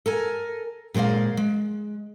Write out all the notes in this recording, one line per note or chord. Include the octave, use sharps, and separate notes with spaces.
A4 A#4 G#5
A#2 G#3 C5 D5 F5
G#3